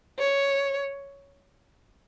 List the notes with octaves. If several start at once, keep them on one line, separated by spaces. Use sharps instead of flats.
C#5